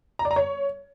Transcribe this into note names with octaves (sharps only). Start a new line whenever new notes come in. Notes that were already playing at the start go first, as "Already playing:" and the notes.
A#5
D5
A#5
C#5